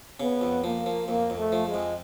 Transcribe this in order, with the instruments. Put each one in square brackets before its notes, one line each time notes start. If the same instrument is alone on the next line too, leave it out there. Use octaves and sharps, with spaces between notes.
[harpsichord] C#3 [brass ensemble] B3
[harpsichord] F2
[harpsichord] F3 [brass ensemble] A#3
[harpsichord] F3
[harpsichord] F2 [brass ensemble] A#3
[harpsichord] F2
[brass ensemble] A3
[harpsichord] F3
[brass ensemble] G#3
[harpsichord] F2